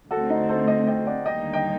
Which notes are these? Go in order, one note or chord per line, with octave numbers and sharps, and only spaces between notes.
D2 D3 A3 C4 F#4 A4
D#4
A4 C5
C5 D#5
D#5 G5
D5 F#5
D#2 D3 G3 A#3 D#4 D#5 G5
D#5 G5